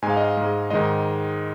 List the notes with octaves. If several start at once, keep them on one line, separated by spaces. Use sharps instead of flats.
G#2 G#3 G#5
F5
D#5
F5
G#2 G#3
G#2 D#3 G#3 D#5